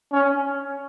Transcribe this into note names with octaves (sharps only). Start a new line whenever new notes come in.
C#4